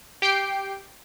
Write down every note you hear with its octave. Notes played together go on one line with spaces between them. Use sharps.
G4 G5 C7 D7